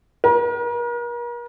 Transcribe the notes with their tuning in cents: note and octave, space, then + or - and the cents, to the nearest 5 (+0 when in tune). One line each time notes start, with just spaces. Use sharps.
A#4 +40